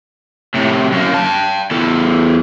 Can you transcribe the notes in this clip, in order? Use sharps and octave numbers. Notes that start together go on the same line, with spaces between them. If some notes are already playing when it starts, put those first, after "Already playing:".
A2 C3
F#2 A#3
G5 A5
E2 A4